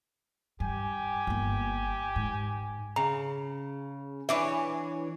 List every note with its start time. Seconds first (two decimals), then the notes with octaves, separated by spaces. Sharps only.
0.60 G2 G4 G#5
1.27 G1 A#3
2.16 G#2
2.96 C#3 A#5
4.29 E3 D4 C#5 E5 D6